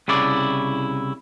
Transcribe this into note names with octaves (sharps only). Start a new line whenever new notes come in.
C2 C#3 E4 D5